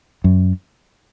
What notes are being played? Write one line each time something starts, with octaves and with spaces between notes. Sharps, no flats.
F#2